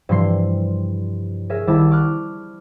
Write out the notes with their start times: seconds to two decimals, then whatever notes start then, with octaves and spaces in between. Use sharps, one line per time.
0.09 G2 C3 E3 F3 C6 C7
1.50 G#4 A#4 C#5 E5
1.67 C2 D#3 E4 A5 D6 E6
1.91 C#6 D6 F6 F#6